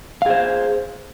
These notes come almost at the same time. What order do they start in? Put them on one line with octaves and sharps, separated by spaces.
F5 G#4 C5